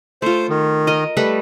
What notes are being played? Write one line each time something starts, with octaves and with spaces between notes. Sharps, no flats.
A3 F4 C5
D#3
A#4 D#5
G3 A3 B4